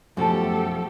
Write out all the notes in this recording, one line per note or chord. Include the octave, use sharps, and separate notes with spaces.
F#2 B2 F3 A3 F#4 G4 A4 A5